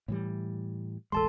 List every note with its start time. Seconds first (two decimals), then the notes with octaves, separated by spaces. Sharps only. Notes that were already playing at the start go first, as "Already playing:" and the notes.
0.08 A2 E3 G3
1.12 E1 A1 G#3 A4 A5 C6